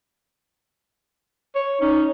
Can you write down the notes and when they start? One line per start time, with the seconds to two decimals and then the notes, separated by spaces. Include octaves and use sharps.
1.55 C#5
1.81 C#4 D#4